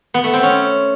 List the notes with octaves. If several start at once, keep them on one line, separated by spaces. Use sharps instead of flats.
B3
A3
C4
C#4